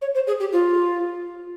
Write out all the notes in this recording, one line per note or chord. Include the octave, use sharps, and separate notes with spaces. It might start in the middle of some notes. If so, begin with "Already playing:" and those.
C#5
C5
G#4
G4
F4